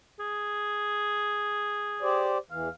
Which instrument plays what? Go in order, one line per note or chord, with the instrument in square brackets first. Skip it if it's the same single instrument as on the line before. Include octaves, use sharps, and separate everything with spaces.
[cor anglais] G#4
[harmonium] G4 C5 D5
[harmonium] E2 E3 [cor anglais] F5